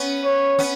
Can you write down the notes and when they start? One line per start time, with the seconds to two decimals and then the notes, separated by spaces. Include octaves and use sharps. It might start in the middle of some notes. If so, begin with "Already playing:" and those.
Already playing: B3 C#4
0.24 C#5
0.59 B3 C#4